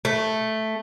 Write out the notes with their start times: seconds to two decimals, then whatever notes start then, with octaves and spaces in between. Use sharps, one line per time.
0.05 A3